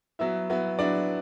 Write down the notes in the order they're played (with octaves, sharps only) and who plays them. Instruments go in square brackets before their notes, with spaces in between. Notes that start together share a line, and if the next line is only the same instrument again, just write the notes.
[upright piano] F#3 B3 E4 E5
F#3 B3 E4
F#3 B3 D4 E4 D5